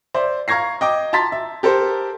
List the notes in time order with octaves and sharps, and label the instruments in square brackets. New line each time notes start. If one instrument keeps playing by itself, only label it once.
[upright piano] C5 D5 E5
F5 A#5 C#6 G#6 A#6 C7
D#5 G5 D6
A5 A#5 C6 A6 B6
E5
G4 A4 A#4 C5